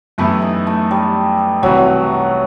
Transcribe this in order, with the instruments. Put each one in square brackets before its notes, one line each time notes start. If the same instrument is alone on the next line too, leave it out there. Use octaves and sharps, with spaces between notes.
[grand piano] F#2 E3 B3 E4 G4 [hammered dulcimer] A3
[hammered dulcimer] D#4
A3
G3
[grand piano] C2 C3 E3 [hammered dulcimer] F#3